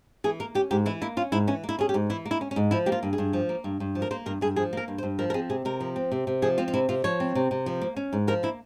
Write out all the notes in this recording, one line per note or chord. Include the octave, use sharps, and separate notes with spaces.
E3 G#4
A#3 A#4
C#4 G4
G#2 G4
E3 E4
A#3 E4
C#4 F4
G#2 E4
E3 C#4
A#3
E4
C#4 G#4
G4
G#2
E3 E4
A#3
E4
C#4
C#4
G#2
F3 E4
A#3 G4
F4
G2
G#4
G2
F3
A#3
G2
G2
F3
A#4
A#3 C5
G2 A#4
G2 G#4
F3 G#4
A#3 A#4
G2
C5
G2
F3 A#4
A#4
C4 G#4
C3 G#4
C3 A#4
F3
C4
C3
C3
F3 G#4
C4 F4
F4
C3 E4
C3 F4
F3 C#5
C4
C3
C3
F3
A#3
C#4
G#2
F3 A#4
A#3 E4